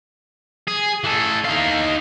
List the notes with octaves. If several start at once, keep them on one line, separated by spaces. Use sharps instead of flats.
G#4
E3 A4
D#4 F5